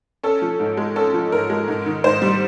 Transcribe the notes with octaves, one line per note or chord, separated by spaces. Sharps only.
C#4 A4
F3
G#2
G#3
C#4 A4
F3
G#2 A#4
G#3
G#2
D#3
G#2 C5
G3